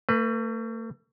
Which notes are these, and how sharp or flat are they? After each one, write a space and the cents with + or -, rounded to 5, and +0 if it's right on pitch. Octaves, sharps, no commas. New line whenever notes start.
A3 +40 B4 +0